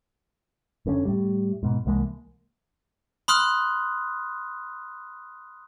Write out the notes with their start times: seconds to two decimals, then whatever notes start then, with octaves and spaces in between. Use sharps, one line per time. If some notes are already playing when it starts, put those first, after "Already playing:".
0.86 F#1 D3 C4 C#4
1.05 A2 G3
1.63 G#2 B2
1.86 C2 E3 G#3 A#3
3.28 B5 C6 D#6 F6 F#6